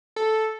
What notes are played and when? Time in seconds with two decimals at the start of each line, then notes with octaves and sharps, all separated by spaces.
0.16 A4